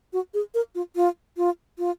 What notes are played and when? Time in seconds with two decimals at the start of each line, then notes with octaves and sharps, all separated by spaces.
0.13 F#4
0.34 G#4
0.54 A#4
0.75 F4
0.96 F4
1.37 F4
1.78 F4